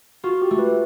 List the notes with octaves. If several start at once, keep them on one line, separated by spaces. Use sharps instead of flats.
F4 F#4
G4
A3
B4